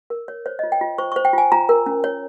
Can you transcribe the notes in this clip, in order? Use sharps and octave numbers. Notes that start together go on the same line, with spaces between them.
A#4
C#5
C5 C#5
F4 D#5
G5
F4
C5 C#6
C5 C#6
G5
F4 G#5
F4 A#5
A#4
C#4
C#5